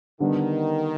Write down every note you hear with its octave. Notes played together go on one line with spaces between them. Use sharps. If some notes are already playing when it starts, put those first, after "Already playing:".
D3 D#3 G3 B3 D4